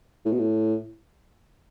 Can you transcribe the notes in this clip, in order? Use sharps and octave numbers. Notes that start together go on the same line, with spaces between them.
A2
B2
A2